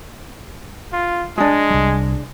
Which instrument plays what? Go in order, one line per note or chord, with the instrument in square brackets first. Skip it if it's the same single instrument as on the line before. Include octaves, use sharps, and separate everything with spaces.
[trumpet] F4
[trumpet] G#3 [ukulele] D4 G#4
[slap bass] C2 G3